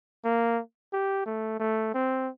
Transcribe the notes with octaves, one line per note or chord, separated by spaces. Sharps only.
A#3
G4
A3
A3
C4